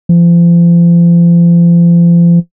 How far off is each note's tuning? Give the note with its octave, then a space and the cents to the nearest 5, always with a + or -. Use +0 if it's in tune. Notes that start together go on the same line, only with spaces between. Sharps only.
F3 -35